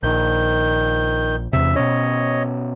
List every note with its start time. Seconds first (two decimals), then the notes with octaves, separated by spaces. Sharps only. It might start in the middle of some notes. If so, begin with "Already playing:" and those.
0.03 A#1 D#3 G6
1.53 E2 C3 E5
1.76 B2 C#4 C#5 D#5